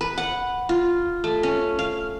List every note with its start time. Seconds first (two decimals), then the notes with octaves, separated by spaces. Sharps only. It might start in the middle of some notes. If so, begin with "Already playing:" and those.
0.01 B4
0.18 F#5
0.69 F4
1.24 A3
1.43 C#4
1.79 F5